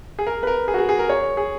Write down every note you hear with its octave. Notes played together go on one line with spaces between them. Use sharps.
G#4
A#4
B4
A#4
G#4
F#4
G#4
G#4
A#4
C#5
G#4